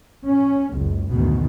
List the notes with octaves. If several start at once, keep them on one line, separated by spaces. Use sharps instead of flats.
C#4
F#1 C#2
F#1 D2 G#2 B2 D#3